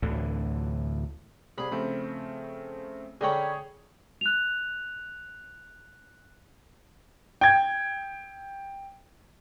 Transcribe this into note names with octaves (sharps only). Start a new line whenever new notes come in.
D2 A2 D3 E3
C2 G#4 B5
C#3 F3 A3 C4
D3 C#4 G#4 A#4 C#5 G5 B5
F#6 F7
G5 G#6